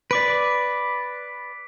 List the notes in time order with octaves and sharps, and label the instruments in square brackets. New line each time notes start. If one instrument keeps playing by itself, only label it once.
[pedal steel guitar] B4 D5 [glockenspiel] D6 B6 D7